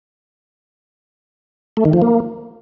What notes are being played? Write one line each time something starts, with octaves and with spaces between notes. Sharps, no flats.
A3
D#3
F3
A#3